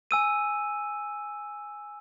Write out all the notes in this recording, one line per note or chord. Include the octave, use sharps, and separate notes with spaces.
G#5 E6 D#7